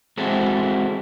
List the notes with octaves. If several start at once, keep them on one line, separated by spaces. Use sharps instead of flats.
G#3 C4 E4 F#4 A4